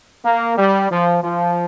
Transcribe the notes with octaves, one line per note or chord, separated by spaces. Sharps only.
A#3
G3
F3
F3